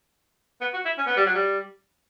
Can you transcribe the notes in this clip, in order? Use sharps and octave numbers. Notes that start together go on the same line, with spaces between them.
B3
F#4
E4
C#4
B3
G3
F#3
G3